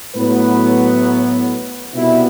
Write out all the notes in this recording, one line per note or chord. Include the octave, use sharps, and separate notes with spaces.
A2 F#3 B3 B4
C2 B2 G3 B3 E4